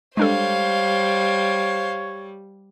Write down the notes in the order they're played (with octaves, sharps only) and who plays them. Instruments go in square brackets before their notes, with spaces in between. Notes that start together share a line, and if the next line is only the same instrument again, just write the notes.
[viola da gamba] G3 [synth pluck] G#3 D4 A4 [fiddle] C5 F5 [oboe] C#5